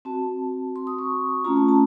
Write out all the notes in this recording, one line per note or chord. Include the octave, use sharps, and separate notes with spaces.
C4 F#4 A5
C6
D#6
C#6
A3 C#4 F4 A#5
A5
A5